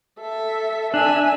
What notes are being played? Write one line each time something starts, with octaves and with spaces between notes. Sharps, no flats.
A4 E5
D4 E5 G#5